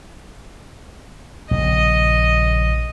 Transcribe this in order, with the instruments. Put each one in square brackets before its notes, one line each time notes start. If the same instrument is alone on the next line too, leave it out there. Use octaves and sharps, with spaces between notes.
[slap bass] A#1 C#3 [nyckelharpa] D#5